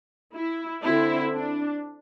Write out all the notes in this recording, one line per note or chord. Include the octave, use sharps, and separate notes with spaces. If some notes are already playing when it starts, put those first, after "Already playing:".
E4
D3 C4 E4
D4